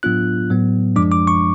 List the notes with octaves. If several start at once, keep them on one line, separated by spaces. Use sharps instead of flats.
A2 F#3 B3 D4 F4 F#6
A2 F#3 B3
F#2 F3 G#3 D4 D6
D6
C#6